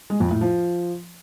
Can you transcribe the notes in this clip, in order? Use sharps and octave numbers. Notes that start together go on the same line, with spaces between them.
G#3
F2
A2
F3